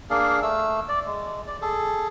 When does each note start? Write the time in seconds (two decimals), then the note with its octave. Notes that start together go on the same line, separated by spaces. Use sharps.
0.10 A#3 D4 G#4 F5
0.42 A3 E6
0.89 D5
1.06 G#3
1.47 D5
1.62 G#4 A4